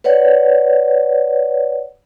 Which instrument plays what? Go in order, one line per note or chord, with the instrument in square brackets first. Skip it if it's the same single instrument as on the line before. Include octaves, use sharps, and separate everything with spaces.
[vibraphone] B4 C#5 D5 F#5